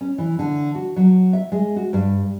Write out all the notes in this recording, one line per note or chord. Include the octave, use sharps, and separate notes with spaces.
C#4
E3
D3
F#4
F#3
E5
G#3
F#4
G2